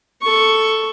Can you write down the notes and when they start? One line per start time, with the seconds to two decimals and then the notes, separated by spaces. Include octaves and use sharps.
0.22 A4 C#6